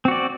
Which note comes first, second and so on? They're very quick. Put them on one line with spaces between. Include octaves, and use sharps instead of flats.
C4 F#4 D5